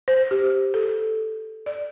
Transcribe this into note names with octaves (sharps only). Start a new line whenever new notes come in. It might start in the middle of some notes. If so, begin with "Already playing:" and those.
C5
G4
A4
D5